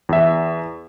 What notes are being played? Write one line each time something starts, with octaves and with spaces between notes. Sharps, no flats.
E2 E5